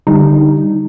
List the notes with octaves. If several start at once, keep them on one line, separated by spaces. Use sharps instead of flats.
D3 G3 D#4